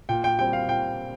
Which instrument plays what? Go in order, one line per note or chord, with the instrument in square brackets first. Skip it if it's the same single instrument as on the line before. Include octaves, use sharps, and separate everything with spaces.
[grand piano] A#2 G5
G5
G3 C4 G5
F5
A#2 G5